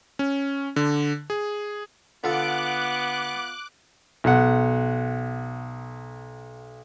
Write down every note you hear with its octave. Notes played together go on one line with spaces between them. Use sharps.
C#4
D3
G#4
D3 B3 F4 A4 D6 F#6
B1 F#5